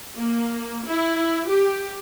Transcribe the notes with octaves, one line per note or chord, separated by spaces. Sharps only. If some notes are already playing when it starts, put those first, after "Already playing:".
A#3
E4
G4